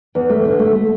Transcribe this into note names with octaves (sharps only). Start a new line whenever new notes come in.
E2
A3
D3
A3
A3